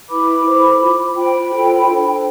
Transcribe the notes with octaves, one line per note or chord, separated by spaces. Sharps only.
E4 B4 B5 D6
E4 A4 C5
F4 C5
F4 C5 G5 B5
F4 A4 C5
D4 A4 C5